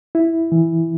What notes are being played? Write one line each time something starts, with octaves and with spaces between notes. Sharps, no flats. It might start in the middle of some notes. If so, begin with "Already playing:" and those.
E4
E3